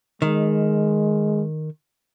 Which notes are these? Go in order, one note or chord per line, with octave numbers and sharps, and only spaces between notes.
D#3 G#3